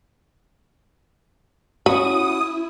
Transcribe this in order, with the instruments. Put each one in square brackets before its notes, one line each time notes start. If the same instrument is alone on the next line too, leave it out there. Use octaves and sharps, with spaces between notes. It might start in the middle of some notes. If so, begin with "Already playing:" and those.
[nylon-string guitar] C#4 F#4 [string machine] E4 [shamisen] B5 [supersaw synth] D#6